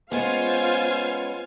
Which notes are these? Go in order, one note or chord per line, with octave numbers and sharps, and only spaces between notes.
G#3 B3 C#4 F4 C5 F5 G#5